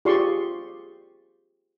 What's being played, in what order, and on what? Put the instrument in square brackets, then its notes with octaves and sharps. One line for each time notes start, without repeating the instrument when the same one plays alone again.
[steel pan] F4 G4 G#4 D5 C6 C#6